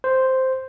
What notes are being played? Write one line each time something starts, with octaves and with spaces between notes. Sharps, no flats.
C5